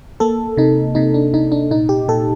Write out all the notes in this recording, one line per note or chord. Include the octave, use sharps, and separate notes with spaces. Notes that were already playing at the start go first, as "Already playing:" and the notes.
A#3 A4
C3 D#4
C3 D#4
D4
C3 D#4
D4
A#2 D#4
G4
A#2 A4